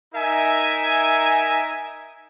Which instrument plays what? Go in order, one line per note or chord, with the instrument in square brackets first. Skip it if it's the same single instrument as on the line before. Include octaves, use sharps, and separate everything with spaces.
[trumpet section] D#4 A#4 E5 G#5